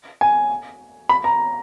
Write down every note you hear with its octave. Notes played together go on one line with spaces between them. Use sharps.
G#5
B5
A#5